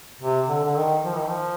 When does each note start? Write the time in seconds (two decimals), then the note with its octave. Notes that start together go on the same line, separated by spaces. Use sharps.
0.21 C3
0.48 D3
0.65 D3
0.76 D#3
1.04 F3
1.17 D#3
1.30 F3